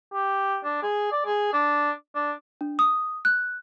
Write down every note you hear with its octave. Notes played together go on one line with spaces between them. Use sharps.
G4
D4
G#4
D5
G#4
D4
D4
D4
D#6
F#6